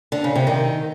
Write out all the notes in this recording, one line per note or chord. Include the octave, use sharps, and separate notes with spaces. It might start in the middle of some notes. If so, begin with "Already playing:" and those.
D3
C#3
C3
D#3